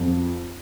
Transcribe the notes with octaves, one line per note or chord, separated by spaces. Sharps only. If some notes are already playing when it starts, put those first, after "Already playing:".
Already playing: F2